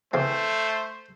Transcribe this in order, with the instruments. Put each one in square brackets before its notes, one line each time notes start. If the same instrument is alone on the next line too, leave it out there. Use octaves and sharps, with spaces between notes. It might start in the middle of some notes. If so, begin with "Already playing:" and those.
[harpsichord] C#3 E3 C4 [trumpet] A3 [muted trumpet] C5